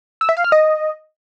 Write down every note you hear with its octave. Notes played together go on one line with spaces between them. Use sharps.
E6
E5
F5
F6
D#5